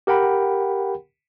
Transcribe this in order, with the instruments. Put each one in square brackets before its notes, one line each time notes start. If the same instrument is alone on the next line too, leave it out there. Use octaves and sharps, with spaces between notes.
[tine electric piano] G4 A#4 F#5 G5 B5